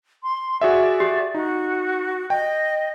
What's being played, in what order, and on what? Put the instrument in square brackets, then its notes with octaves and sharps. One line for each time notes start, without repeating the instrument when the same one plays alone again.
[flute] C6
[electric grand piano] F#4 G#4 E5 [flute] D5
[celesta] G4
[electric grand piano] D#4 [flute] F#4
[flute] D#5 [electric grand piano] G5